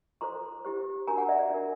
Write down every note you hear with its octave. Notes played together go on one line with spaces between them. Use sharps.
F4 A4 C5 A#5 C6
E4 G4 C5
D4 F#4 A#4 G#5 A#5
F#5 G#5
D5 E5
D5
D4 F4 A#4